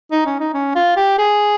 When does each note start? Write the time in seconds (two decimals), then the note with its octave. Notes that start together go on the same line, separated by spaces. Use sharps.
0.11 D#4
0.26 C#4
0.40 D#4
0.54 C#4
0.75 F4
0.97 G4
1.18 G#4